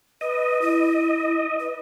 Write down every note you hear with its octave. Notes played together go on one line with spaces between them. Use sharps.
B4 D#5
E4
B4